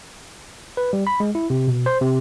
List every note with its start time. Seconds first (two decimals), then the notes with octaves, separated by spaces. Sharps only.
0.77 B4
0.93 G3
1.07 B5
1.20 G#3
1.35 E4
1.50 C3
1.68 B2
1.86 C5
2.02 C3